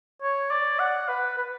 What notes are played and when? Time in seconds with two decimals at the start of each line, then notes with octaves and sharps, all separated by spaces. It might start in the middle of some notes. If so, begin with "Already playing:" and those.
0.22 C#5
0.51 D5
0.79 F#5
1.08 B4
1.37 B4